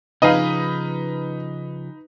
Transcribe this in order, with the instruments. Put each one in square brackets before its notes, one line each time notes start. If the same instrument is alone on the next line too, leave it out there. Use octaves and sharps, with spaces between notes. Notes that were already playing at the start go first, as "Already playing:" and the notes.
[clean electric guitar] C#3 F3 G#4 [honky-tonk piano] D#4 B4 [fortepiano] D#5 F5